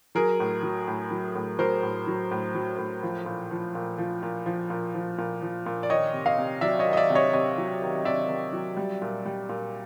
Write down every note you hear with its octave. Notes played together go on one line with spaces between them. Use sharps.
F#3 G#4 A#4
A2
F#3
A2
F#3
A2
F#3 A#4 C5
A2
F#3
A2
F#3
A2
F3
A#2
F3
A#2
F3
A#2
F3
A#2
F3
A#2
F3
A#2
D5
D#3 C#5 D#5
C3
D#5 F5
C3
F#3 D5 E5
C#5 D#5
D#3
D#5
D5 E5
C3
C#5 D#5
C3 C#5 D#5
F#3
D#3
C3 D5 E5
C3
F#3
G3
A#2
G3
A#2